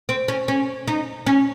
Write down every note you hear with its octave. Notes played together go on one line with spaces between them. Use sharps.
C4
C#4
C#4
D#4
C#4